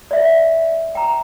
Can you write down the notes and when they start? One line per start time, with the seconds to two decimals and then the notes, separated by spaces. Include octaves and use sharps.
0.11 D5 E5
0.95 G5 A#5